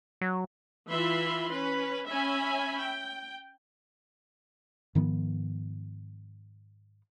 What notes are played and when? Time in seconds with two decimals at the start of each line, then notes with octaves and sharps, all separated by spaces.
0.21 F#3
0.90 E3 F4 E5 B5 C6
1.51 C#4 B4
2.09 C#4 E5 G#5 B5
2.80 G5
4.95 G#2 D#3 F3 B3